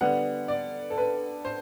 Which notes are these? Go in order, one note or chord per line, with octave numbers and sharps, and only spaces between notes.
D3 G3 B3 F#5
D5
A4
B4
C5